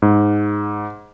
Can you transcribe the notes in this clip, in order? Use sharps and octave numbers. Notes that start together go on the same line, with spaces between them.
G#2